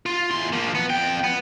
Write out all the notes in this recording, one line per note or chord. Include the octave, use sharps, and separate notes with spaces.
F4
E2 C6
F3 A#3
B3
F2 G5
B3